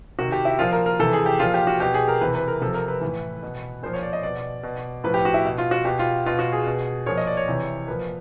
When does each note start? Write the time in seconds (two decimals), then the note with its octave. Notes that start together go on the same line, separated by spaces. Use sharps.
0.19 C3 D#3 F#4
0.32 G4
0.45 E4
0.59 A#2 F3 F4
0.72 A#4
0.86 A#4
0.99 C3 E3 A4
1.13 G#4
1.26 G4
1.40 A#2 F3 F4
1.54 G4
1.67 F#4
1.80 B2 G4
1.94 G#4
2.08 A#4
2.21 C3 E3 B4
2.35 B4
2.48 A#4
2.61 C3 F3 A4
2.74 A#4
2.88 B4
3.01 A2 E3
3.43 B2
3.83 A#2 F3 C5
3.93 C#5
4.03 D5
4.13 D#5
4.23 B2 D5
4.63 B2
5.04 A2 F3 B4
5.14 G4
5.25 F#4
5.34 E4
5.45 B2
5.58 F4
5.71 F#4
5.85 B2 G4
5.99 F4
6.26 B2 F4
6.39 F#4
6.52 G#4
6.67 B2
7.06 A#2 F3 C#5
7.17 D#5
7.27 D5
7.37 C#5
7.48 C3 E3
7.88 A#2 F3 B4